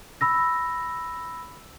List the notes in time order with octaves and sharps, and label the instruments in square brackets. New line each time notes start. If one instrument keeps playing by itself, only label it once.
[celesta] B5 E6 A#6